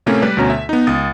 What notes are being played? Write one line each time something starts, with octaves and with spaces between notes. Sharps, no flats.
A2 C3 A3 A#3 C#4 E4
G3 B4 D5
D2 B2 C#4 A#5
E5
B3 D#4
C#2 D#6 A6